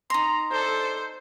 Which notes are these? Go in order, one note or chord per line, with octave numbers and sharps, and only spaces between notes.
D#4 A#5 C6
D4 A4 C5